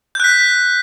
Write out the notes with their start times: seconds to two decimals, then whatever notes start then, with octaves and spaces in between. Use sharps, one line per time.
0.15 G6
0.20 F#6
0.24 B6